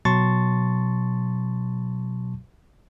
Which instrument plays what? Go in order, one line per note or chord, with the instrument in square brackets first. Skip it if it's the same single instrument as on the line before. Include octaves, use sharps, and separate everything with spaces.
[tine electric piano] B2 F#3 A5 C6 C#6 A6